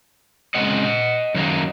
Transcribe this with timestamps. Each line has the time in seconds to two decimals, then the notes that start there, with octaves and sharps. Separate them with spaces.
0.55 C#3 G#3 C4 D#5 F#5
1.35 F#2 D#3 F#3 A#3 D#4